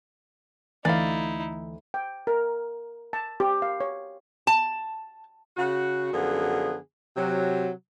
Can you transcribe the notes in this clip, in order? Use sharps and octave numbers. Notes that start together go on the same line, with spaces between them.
D2 E3 D#4 E4 D5 F5
G5
A#4
A5
G4
F5
C#5
A5
C#3 F#4
F#2 D3 F3 B3 G#4
C3 F#3